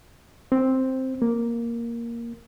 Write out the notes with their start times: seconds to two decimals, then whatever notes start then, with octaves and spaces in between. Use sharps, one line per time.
0.52 C4
1.22 A#3